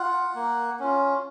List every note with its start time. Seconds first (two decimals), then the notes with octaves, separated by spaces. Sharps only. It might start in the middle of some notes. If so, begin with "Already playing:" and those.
Already playing: F4 F#5
0.35 A#3
0.79 C#4 F4